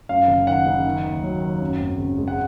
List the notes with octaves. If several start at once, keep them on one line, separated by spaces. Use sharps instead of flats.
F#2 F5
F#1
D#3 F#5
F#1
D#3
D#2
F#3
D#2
F#2
G#1
C#3
G#3
F#5